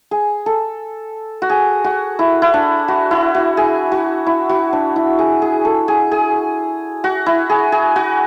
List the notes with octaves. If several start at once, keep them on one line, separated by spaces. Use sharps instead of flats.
G#4
A4
F#4
G#4
F#4
E4
E4
D4
F#4
E4
F#4
G#4
F#4
E4
F#4
D4
E4
G#4
G#4
A4
G#4
G#4
F#4
E4
G#4
G#4
F#4